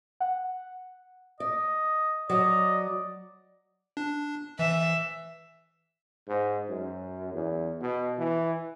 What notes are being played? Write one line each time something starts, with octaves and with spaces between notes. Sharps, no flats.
F#5
D5 D#5
F#3 D5 D#5
D4
E3 E5
G#2
F#2
E2
B2
E3